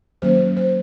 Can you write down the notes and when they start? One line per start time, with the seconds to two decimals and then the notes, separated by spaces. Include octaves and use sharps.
0.22 D#3 F#3 A#3 C#4 C5
0.56 C5